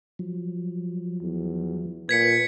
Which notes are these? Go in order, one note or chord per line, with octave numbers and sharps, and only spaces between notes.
F3 F#3
E2
A#2 B4 G#6 B6 C#7